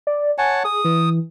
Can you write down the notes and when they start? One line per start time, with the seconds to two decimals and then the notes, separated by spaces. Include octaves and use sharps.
0.07 D5
0.38 C#5 F#5 G#5 A5
0.65 G#4 D#6
0.85 E3